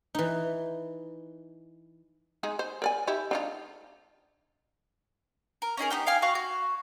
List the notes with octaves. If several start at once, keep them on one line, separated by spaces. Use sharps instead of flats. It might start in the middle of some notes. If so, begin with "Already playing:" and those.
E3 D#4
G#3 D#4 G#4
C5
A#4 D5 G#5
D#4 E4 G4
D4 D#4 F4
A#4
C#4 D#4 G#4 A#4
B3 C#4 D#4 G4
F5 G5 G#5 F6
F#4 F5 C#6
F#4